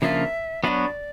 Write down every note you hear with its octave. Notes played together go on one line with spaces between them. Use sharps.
C#3 F3 A#3 D4 F4 E5
F#3 B3 D4 F#4 B4 D5 E5